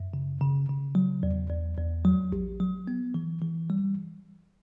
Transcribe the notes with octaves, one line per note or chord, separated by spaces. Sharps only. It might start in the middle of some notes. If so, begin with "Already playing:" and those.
Already playing: F#2
C#3
C#3
C#3
F#3
E2
E2
E2
F#3
A1
F#3
B3
E3
E3
G3